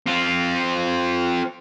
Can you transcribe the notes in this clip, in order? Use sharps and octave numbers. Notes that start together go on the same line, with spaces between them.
C4 F4